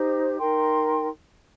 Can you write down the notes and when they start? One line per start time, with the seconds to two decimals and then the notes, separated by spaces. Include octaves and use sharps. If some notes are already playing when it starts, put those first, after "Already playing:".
Already playing: D#4 G4 C5
0.38 D#4 A#4 G5 C6